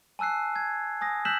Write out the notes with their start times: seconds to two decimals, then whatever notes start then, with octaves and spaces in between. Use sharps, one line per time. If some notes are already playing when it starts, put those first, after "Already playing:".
0.19 G#5 A5 E6 F#6 C7
0.56 G#6
1.01 G#5 D#6 A#6
1.25 E6 F#6 G6 B6 E7 F#7